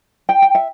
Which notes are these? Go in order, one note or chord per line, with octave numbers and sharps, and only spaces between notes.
G5
G5
E5